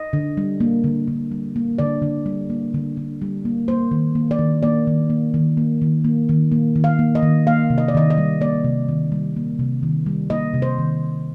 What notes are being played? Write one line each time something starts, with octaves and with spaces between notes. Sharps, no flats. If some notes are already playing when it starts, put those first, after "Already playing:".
Already playing: D#5
D3
G3
A#3
D3
D3
G3
A#3
D3 D5
D3
G3
A#3
D3
D3
G3
A#3
A#3 C5
D#3
A#3
D5
D#3
A#3 D5
D#3
A#3
D#3
A#3
D#3
A#3
D#3
A#3
D#3
F5
A#3
D#5
D#3
A#3 F5
C3
D#5
D5
D#3 D#5
D#5
G3
A#3 D5
C3
D#3
G3
A#3
C3
D#3
G3
A#3 D#5
C3
C5
D#3